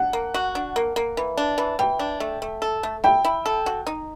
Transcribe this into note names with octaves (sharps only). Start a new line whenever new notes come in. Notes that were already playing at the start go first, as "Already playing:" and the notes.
Already playing: D4 F#5
A#3
F#4
D4
A#3
A#3
E3
D4
E3
E3 G5
D4
A3
A3
A4
A3
E4 G5
E4
A4
F#4
D#4